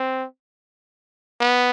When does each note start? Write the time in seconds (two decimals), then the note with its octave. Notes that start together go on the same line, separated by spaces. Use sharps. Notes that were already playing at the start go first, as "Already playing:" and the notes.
Already playing: C4
1.41 B3